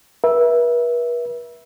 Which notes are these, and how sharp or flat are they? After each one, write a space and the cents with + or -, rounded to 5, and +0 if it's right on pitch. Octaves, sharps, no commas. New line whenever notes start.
B4 -40 E5 +0